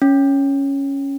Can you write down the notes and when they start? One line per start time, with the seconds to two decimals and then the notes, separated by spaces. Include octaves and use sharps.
0.02 C#4